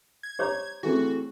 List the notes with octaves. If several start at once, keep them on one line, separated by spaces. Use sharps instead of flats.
G#6
G4 C5 C#5 A#5 D6
E3 A3 C4 F#4 G#4